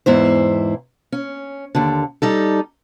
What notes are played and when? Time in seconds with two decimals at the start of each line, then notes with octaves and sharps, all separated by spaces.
0.06 E2 G#2 E4 C5
1.12 C#4
1.75 D#2 D3
2.22 G3 D#4 A4